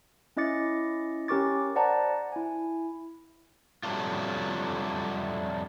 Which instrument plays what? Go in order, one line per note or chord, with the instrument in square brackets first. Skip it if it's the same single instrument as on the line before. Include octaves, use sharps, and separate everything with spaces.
[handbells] C#4 E4 D#5 D6 A6 C#7
C#4 G4 A#4 C#6 D6 A6
C5 D5 F#5 A5 A#5
E4 G#5
[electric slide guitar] F2 F#3 G3 A3 D4 F4